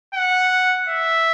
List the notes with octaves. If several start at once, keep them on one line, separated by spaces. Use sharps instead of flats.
F#5
E5